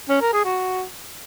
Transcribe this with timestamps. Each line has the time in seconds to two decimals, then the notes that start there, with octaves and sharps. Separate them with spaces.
0.09 C#4
0.21 A#4
0.33 G#4
0.45 F#4